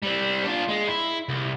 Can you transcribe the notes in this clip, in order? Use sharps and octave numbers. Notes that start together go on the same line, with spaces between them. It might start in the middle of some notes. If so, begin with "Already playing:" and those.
G3 C4
D4 F4
G#3
E4
C2